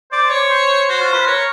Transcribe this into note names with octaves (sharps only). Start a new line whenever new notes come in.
C5 D5
C#5
C5
F#4 C5
F4
B4
A#4 C#5